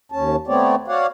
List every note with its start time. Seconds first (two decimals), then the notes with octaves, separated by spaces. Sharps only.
0.12 D#2 C#4 A5
0.47 A3 B3 C4 C#5 D5
0.88 F#4 C#5 D5 F5 F#5